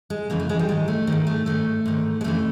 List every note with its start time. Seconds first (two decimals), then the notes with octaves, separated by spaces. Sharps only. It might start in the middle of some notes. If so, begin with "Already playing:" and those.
0.10 G#3
0.30 F2 C#3 E3 A#3
0.40 A3
0.49 G#3
0.59 G3
0.69 G#2 D#3 G#3
0.88 A3
1.07 G#2 D#3
1.27 A3
1.46 G#2 D#3 A3
1.86 G#2 D#3
2.21 G#3
2.24 F2 C#3 E3 A3